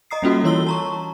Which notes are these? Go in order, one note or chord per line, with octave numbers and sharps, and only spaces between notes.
D#5 A#5 D#6 C7
G3 A#3 C#4 F4 F#4 A4
E3 E4 C#5 C6 E6 G7
A5 A#5 C#6